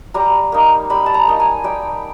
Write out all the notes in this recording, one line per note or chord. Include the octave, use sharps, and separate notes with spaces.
G3 A#5
A#3 D#4
G3 B5
A5
A#5
A#3 D#4
G#5
G3 G5